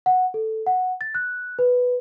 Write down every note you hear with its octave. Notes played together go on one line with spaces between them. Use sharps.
F#5
A4
F#5
A6
F#6
B4